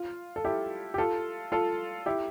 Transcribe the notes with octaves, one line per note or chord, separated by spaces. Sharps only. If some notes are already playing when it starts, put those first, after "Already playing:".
Already playing: F4
A4
E4 G4
G4
F4 A4
F4 A4
E4 G4